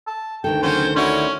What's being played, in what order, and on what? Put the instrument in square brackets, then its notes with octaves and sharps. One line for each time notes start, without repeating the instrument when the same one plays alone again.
[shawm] A5
[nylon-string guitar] D2 D#3 A4 [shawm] G5
[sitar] C#3 F#3 C#4 [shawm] C5
[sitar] D3 E4 F#4 [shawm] C#4